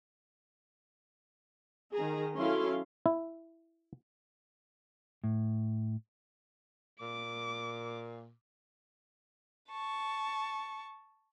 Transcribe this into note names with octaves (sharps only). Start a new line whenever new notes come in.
D#3 G#4 A#5
F#3 C#4 E4 A4 F5 C6
E4
A2
A#2 D6
A5 C#6